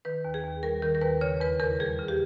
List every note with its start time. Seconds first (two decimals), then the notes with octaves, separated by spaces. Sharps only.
0.05 D#3 B4
0.25 D#2
0.34 G#4
0.44 D#2
0.63 G3 A#4
0.82 D#3 A#4
0.95 A#4
1.01 D#2 B4
1.21 C#3 C#5
1.40 E2 B4
1.60 E2 A#4
1.80 G3 G#4
1.99 C#3
2.08 G4